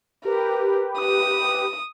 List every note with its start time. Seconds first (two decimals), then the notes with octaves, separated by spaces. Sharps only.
0.25 G4 A#4 B4
0.99 D#6